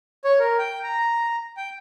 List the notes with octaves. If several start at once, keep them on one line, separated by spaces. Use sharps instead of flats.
C#5
A#4
G5
A#5
G5